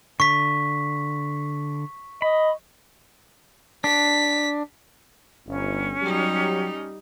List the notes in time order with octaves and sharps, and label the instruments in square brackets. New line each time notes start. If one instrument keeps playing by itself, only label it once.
[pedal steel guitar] D3 [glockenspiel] C#6 B6
[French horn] D#5 [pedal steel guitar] B5
[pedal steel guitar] D4 [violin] B6
[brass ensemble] G1 [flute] C#4
[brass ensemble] F#3 G4 [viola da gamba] G3 D#4